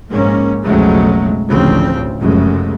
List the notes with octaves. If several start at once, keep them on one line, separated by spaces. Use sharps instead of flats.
A#1 G#2 A#3 C#4
B1 F2 C#3 F#3 G#3 A3
A1 D2 C#3 F3 C4
F1 F#2 C#3 G#3 A3